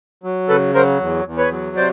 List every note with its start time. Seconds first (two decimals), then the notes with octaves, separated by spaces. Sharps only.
0.24 F#3
0.49 C#3 A4 B4
0.74 F#3 A#4 C5
1.00 E2
1.25 E2
1.38 B4 C#5
1.51 F#3
1.77 C3 C5 D5